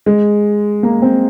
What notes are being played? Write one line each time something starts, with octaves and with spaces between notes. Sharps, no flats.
G#3
A#3
C4